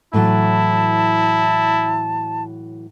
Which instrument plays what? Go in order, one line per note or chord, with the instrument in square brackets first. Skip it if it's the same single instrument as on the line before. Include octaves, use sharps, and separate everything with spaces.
[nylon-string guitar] A2 E3 F#3 [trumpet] E4 [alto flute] A5